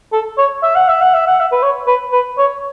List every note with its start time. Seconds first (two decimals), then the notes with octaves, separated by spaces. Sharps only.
0.12 A4
0.38 C#5
0.63 E5
0.76 F#5
0.88 E5
1.01 F#5
1.14 E5
1.27 F#5
1.40 E5
1.52 B4
1.62 C#5
1.87 B4
2.12 B4
2.38 C#5